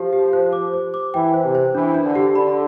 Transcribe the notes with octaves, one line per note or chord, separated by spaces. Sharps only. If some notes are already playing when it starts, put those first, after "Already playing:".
Already playing: F3 G4
G4
C5
D6
C5
D6
E3 G5
C5
C3
C5
E3 D4
D4
D3
G4
D3 B5